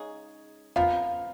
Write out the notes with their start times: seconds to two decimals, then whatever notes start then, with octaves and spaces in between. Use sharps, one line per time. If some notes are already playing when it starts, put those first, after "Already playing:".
Already playing: C#3 G#3 D#4 G#4
0.76 F3 B3 F4 A#4 F5